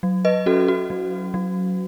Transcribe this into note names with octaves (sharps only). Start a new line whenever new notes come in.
F#3
B4 D#5
C#4 F#4 A4
F#4
F#3
F#3